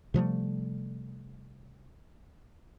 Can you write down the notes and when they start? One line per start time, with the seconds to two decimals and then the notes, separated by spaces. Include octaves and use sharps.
0.14 C3 F3 G3 A3